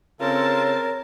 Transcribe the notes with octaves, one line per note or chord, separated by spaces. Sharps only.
C#3 C4 F4 A4 A#4 C#5 A5